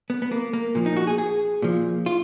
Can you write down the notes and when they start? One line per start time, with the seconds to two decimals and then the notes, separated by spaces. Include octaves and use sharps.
0.10 B3
0.22 B3
0.32 A#3
0.53 A#3
0.75 A#2 F3
0.86 D#4
0.97 F#4
1.07 G#4
1.18 G#4
1.62 A#2 F3
2.06 F4